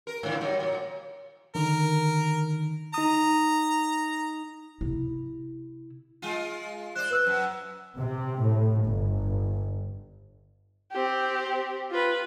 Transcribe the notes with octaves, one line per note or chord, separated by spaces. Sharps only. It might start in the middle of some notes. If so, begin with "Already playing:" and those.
A#4
G#2 D3 F3
F#3 G3 D#4
A#2 F#3
D3 D#3 A#4
D#4 A#5 D#6
C3 E4
G#3 F4
C5 D5 F#6
B4 E6 F#6
F#2
C3
A2
G1
C4 G4
F4 B4